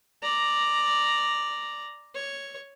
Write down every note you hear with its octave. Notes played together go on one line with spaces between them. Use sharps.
D5 A#5
C#5